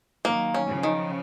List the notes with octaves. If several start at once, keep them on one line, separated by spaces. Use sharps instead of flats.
D#3 F#3 A#3
C#4
C#3 F3
D#3